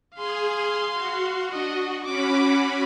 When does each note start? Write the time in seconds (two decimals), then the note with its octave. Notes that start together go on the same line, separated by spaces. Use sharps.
0.16 G#4 F5 C6
0.93 F#4
1.52 D4 D#5
2.05 C#4 F#4 B5 D6